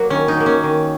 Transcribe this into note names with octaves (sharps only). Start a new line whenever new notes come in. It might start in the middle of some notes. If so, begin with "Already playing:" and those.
Already playing: F#3 A#3 F#4
D#3 C#4
D#4
F#3 A#3
C#4
D#3